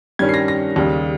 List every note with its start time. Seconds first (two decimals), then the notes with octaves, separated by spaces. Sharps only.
0.19 G2 D#3 G3 C#4 G#6
0.29 C7
0.34 A#6
0.48 A#6
0.76 D#2 C#3 G3